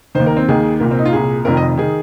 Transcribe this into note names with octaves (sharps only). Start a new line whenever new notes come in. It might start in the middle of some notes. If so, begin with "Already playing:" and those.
D#2 D#3 C5
A#4
C4
D#2 D#3 G#4
C2 A#2 A#4
C4
D#4
F4
C2 A#2 G#4
F1 F2 D#3 A#4
D#5
D#3 G#4